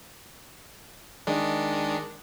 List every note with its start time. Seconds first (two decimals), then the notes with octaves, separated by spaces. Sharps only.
1.27 D#3 G#3 D4